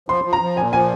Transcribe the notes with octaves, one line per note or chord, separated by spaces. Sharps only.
F3 C6
F3
A#5
F3
A#2 G#5
F3 G#5